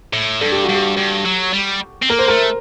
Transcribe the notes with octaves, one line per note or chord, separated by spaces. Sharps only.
A2
G2 A4
G4
F#4
G2
G4
G2
F#3
G3
C4
A#3 A#4
C5
A3 A#4